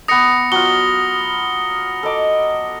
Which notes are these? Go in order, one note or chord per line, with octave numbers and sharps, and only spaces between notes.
B3 D6 D#6 A#6 C#7
F#3 F4 G7
A4 D#5 D6